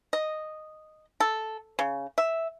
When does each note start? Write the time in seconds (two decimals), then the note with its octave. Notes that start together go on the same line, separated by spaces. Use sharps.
0.13 D#5
1.20 A4
1.79 C#3
2.18 E5